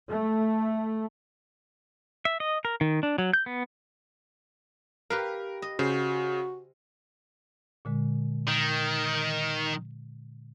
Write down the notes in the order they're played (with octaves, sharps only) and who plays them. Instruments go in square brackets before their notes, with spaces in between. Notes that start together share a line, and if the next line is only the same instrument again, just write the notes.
[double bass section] A3
[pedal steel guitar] E5
D#5
A#4
D#3
D4
F#3
G6
B3
[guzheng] G4 B4 F5 [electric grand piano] A#4
[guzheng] D#5
[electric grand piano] C#3 [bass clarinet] F#4 [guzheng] C5
[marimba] A#2 D3 G#3
[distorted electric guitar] D#3